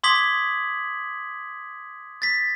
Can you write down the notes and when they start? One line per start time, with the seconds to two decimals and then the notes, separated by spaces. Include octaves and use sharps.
0.04 C6 D6 D#6 G#6 B6 F#7
2.22 A6 B6